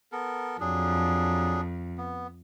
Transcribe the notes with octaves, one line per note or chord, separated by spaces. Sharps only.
B3 A4 A#4
F2 F#3 D4 G#4
B3